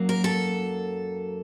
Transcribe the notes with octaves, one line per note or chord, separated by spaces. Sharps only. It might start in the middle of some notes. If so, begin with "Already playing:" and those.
Already playing: F#2 F#3 A#3
A#4
A4